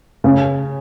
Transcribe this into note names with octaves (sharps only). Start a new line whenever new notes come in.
C#3